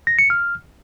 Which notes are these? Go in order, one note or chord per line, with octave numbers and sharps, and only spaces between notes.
A#6
C#7
F6